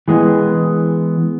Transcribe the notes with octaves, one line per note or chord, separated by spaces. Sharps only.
E3 G#3 B3